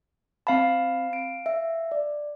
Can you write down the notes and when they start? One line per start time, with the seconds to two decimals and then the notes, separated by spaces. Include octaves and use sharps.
0.47 C4 F5 A5 B5
1.13 D7
1.46 E5
1.92 D5